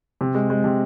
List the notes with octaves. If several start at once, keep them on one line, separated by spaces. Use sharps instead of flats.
C3
G#3
G#3
C3